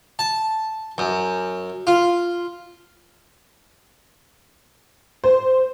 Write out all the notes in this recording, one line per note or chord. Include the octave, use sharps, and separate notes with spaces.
A5
F#2
F4
C5